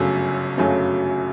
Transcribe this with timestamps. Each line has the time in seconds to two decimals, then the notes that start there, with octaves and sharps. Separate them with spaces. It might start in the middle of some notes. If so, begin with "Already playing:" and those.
Already playing: G1 F#2 C#3 F#3 A3
0.58 G1 F#2 C#3 F#3 A3